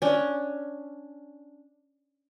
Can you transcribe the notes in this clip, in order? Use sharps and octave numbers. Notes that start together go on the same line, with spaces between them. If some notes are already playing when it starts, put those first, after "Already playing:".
C#4 D4